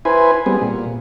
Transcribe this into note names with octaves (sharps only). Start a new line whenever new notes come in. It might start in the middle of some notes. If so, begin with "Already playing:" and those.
E4 B4 C5 G#5
G3 B3 C4 G#4
A#2